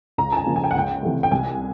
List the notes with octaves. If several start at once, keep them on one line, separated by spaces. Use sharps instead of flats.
C#2 A#5
A5
G#5
C#3 F3 A#3
G#5
G5
F#5
C#2 G5
C3 E3 A3
G5
C2 G#5